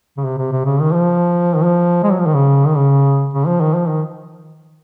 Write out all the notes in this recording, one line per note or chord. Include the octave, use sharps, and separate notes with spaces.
C#3
C3
C3
C3
C#3
D#3
F3
D#3
F3
G#3
F#3
F3
D#3
C#3
D#3
C#3
C#3
F3
D#3
F3
D#3